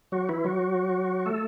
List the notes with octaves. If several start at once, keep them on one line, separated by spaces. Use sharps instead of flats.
F#3 F#4
E3 E4
F#3 F#4
A3 A4